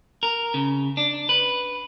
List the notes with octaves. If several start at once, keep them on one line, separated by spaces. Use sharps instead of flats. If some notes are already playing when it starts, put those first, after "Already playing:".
A#4
C#3
D4
B4